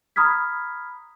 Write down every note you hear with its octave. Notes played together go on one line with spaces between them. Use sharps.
A#5 B5 D#6 F6 G#6 B6